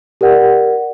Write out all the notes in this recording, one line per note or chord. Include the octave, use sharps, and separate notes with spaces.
G4 A#4 D5 F#5